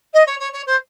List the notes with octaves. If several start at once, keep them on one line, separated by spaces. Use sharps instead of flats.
D#5
C#5
C#5
C#5
C5